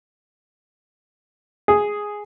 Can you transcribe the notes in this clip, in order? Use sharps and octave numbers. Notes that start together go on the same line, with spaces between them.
G#4